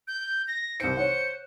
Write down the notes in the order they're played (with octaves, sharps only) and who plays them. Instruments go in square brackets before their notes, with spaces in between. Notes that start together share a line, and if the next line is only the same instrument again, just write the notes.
[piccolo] G6
A#6
[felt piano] C2 C#7 [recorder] C5
[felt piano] C#5 F#5 [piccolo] C#7